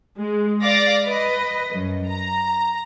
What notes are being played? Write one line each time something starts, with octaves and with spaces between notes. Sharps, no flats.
G#3
D5 F5 D6 A6 A#6
B4 D#5
F#2
A#5